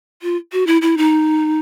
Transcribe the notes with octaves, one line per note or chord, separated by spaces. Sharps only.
F4
F#4
E4
E4
D#4